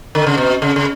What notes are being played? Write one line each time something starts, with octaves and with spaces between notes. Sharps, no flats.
D3
C#3
B2
C#3
C#3